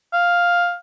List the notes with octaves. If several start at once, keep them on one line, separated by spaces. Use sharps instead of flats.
F5